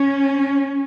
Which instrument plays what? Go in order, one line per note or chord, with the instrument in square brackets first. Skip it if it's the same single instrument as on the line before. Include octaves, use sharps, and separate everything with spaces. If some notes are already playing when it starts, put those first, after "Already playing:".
Already playing: [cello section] C#4